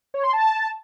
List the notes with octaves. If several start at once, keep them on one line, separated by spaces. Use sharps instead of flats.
C#5
C6
A5